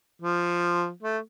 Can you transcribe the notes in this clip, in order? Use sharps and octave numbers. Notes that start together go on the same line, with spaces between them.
F3
A3